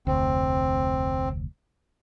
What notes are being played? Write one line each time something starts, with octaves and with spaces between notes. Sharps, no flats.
F1 D2 C4